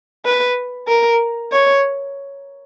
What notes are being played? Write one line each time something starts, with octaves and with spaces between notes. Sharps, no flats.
B4
A#4
C#5